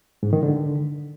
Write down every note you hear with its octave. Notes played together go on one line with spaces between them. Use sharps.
G#2
D#3
D3